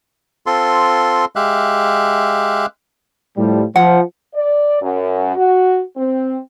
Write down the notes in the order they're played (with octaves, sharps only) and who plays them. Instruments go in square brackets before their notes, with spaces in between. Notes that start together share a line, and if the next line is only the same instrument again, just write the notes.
[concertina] C4 F4 A4 C6
G#3 G4 E5 F5 F#6
[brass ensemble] A2 F3 G3
[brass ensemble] F3 [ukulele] F#5
[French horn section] D5
F#2
F#4
C4